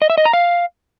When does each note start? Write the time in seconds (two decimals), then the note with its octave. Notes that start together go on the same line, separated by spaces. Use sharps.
0.02 D#5
0.10 E5
0.18 D#5
0.25 A#5
0.33 F5